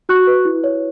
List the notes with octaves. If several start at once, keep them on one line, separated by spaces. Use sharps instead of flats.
F#4 C#6 F#6
B4
E4
C#5